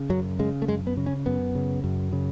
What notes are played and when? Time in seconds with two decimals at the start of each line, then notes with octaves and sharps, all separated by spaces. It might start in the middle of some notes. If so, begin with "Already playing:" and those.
Already playing: C#3
0.09 F#2 F#3
0.39 C#3 G#3
0.62 A3
0.68 F#2 G#3
0.87 B3
0.97 C#3
1.06 C#4
1.26 F#2 B3
1.55 C#3
1.84 F#2
2.13 C#3